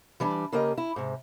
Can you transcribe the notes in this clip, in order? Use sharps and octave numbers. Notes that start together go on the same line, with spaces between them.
E3 G3 D4
C#3 A#3 G4 A#4 D#5
E4
G#2 C3